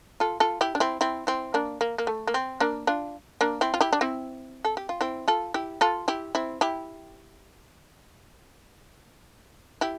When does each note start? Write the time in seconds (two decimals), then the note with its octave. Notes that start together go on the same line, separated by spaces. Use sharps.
0.20 F4 A4
0.40 F4 A4
0.61 E4 G4
0.75 D4
0.80 C4 E4
1.01 C4 E4
1.27 C4 E4
1.54 A#3 D4
1.81 A#3
1.98 A#3
2.07 A3
2.27 A#3
2.34 C4
2.60 A#3 D4
2.87 D4 F4
3.41 A#3 D4
3.61 C4 E4
3.74 F4
3.81 E4 G4
3.93 D4
4.01 C4 E4
4.65 A4
4.77 G4
4.89 F4
5.01 C4 E4
5.28 F4 A4
5.54 E4 G4
5.81 F4 A4
6.08 E4 G4
6.35 C4 E4
6.61 E4 G4
9.81 E4 G4